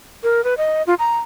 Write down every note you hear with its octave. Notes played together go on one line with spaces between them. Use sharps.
A#4
B4
D#5
F4
A#5